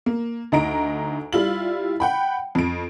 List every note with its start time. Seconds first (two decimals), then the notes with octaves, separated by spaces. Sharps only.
0.06 A#3
0.52 D2 D#4 A#5 D7
1.33 G3 E4 F4 F#7
2.00 F#5 G5 B5
2.55 F2 D7